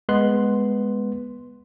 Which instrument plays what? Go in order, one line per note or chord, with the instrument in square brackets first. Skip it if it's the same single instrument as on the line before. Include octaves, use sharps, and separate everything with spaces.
[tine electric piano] G#3 B3 C6 F#6